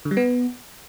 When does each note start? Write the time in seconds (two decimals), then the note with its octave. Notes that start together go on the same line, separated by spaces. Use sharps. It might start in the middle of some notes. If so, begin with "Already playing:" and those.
0.05 D3
0.11 G3
0.17 B3